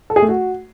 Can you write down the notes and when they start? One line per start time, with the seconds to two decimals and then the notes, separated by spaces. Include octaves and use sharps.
0.10 A4
0.16 G#4
0.22 A3
0.29 F#4